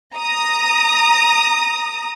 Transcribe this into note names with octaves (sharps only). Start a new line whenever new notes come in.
A#5 D#6